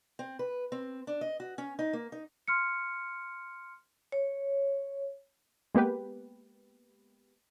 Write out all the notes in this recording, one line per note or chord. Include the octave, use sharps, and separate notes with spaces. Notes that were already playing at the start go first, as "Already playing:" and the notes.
C4
B4
C4
D4
D#5
F#4
C#4
D#4
A#3
D#4
C6 F6 C#7
C#5
G#3 A#3 B3 G4 B4